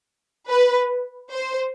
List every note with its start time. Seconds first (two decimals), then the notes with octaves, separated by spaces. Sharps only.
0.49 B4
1.31 C5